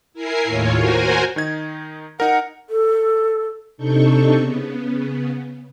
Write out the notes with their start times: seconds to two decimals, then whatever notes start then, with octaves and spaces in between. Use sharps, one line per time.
0.14 E4 A#4 G#5 C7
0.44 D#2 A2 F4 C#5
0.76 F#4 A#4 C5 G#5
1.36 D#3 D#4 G#6
2.20 D#4 A#4 F#5
2.70 A4
3.78 C3 D4 D#4 A4 C#6 G6
4.38 C#3 B3